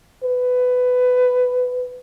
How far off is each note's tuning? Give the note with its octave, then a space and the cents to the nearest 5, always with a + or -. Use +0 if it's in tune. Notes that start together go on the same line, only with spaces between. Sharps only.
B4 +15